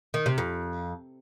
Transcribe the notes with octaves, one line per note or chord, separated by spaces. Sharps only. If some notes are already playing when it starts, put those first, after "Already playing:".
D#3
C3
F2